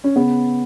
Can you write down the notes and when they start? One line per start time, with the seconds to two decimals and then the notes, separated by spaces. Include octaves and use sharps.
0.04 C#4
0.15 C#3 B3